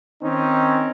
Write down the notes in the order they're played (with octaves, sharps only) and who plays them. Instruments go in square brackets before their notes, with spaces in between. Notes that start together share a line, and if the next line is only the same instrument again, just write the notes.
[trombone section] D#3 C4 C#4 D#4